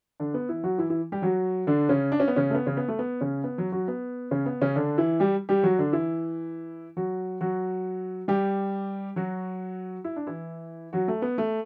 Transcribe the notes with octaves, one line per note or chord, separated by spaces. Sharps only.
D3 D4
B3
E3 E4
F#3 F#4
E3 E4
E3 E4
G3 G4
F#3 F#4
D3 D4
C#3 C#4
D4
C#4
B3
C#3 C#4
A3
B3
C#3 C#4
B3
A3
B3
C#3 C#4
B3
F#3 F#4
F#3 F#4
B3
C#3 C#4
B3
C#3 C#4
D3 D4
E3 E4
G3 G4
G3 G4
F#3 F#4
D3 D4
E3 E4
F#3 F#4
F#3 F#4
G3 G4
F#3 F#4
E4
D4
E3 E4
F#3 F#4
A3
B3
A3